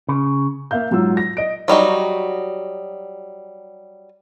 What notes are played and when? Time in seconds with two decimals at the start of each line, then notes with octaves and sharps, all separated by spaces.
0.09 C#3
0.71 A#3 E5 F5 G6
0.91 G#2 F#3 F4 E6
1.17 A#6
1.37 D#5 D7
1.68 F#3 G3 D#4 F#4